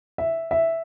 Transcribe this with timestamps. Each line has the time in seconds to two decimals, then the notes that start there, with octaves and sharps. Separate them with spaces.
0.18 E5
0.51 E5